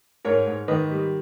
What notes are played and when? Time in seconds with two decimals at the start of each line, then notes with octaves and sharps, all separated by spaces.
0.25 G#2 A#4 C#5
0.47 G#2
0.68 D#3 B4 D#5
0.91 G3